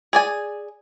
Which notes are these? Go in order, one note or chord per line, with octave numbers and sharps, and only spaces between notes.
G#4 D5 G#5